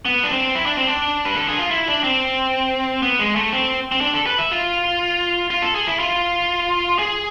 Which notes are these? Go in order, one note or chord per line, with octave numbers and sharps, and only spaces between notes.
B3
D4
C4
E4
D4
C4
D4
B4
A4
G#4
F4
E4
D4
C4
B3
G#3
A3
C4
C4
D4
A4
B4
E5
F4
F4
A4
G#4
E4
F4
G#4